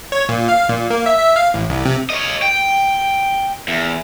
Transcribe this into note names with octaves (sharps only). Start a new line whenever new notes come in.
C#5
A#2
F5
A#2
A#3
E5
E5
F5
A1
C2
C3
C#5 D#5
G5
E2